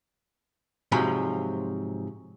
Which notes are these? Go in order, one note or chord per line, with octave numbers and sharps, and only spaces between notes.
G#2 C3 F3 F#3 B5